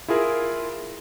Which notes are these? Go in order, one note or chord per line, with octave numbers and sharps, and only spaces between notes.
E4 F4 G#4 A#4